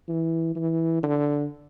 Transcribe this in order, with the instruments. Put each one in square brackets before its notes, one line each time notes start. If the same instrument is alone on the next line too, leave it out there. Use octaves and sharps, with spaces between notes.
[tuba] E3
E3
D3